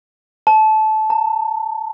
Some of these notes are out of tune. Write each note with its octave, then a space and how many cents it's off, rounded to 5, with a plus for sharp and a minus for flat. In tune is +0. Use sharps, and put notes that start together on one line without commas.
A5 -20
A5 +45